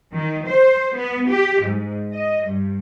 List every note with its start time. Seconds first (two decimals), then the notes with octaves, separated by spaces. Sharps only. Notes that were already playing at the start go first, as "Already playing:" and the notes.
0.13 D#3
0.47 C5
0.95 B3
1.28 G4
1.63 G#2
2.14 D#5
2.46 G2